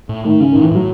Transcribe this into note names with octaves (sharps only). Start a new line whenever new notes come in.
A2
D#3 A3
C#3 C#4
D#3
A2
E3
A2 F#3